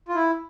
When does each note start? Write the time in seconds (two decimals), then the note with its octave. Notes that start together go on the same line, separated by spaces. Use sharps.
0.08 F4
0.15 E4